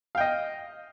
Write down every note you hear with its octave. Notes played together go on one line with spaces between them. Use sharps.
D#5 F5 G5